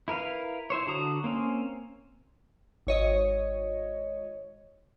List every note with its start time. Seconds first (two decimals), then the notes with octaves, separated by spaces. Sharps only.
0.08 E4 A#4 B4 F5
0.70 E4 C5 C#5
0.87 D3 D4 F#4 A#5 D#6
1.24 A#3 C4 C#4
2.87 G#1 C#5 D#5